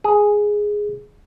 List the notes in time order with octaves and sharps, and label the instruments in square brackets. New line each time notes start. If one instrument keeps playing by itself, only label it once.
[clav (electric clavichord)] G#4